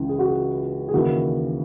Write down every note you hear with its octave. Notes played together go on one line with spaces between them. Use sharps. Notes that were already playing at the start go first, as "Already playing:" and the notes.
Already playing: C#2 C#3 E3
G#4
F#4
G#4
G#4
D#2 C#3 E3 F#4